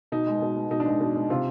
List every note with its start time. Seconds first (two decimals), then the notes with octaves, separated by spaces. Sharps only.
0.12 B2 D#4
0.27 G#3
0.42 B2
0.56 G#3
0.71 B2 D#4
0.80 D4
0.86 G#3 D#4
1.01 B2
1.15 G#3
1.30 C3 F4